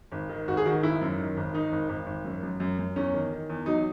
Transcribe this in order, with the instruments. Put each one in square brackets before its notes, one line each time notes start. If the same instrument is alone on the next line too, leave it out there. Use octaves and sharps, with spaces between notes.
[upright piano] G#1
D#3
G#1 F#4
G#4
D#3 F#4
G#1 E4
F#2
D#3
G#1
D#3 D#4
G#1
G#1
G#1
F#2
F#2
F#2
F#2
E2 C#4
D#3
D#3
E2
F#3 D#4